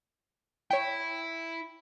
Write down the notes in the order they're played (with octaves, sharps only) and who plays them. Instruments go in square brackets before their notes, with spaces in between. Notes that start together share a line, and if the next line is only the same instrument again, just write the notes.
[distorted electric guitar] E4 [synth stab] C#5 G5